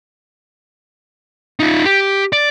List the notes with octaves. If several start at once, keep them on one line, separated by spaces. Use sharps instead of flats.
D#4 F4
G4
D5